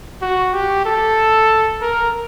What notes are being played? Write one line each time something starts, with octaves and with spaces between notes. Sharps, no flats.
F#4
G4
A4
A#4